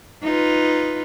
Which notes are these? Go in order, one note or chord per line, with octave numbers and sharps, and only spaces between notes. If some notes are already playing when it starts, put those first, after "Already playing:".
D#4 F4 B4